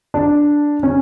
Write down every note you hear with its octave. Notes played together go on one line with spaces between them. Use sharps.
D4
C#4